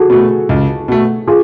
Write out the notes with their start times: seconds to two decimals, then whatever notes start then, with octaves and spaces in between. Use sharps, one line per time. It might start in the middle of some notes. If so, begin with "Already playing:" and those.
Already playing: F#4 G#4 A4
0.10 B2 A3
0.49 C#2
0.88 B2 A3
1.27 F4 G#4